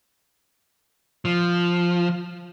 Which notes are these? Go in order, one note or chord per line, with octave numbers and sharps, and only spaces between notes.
F3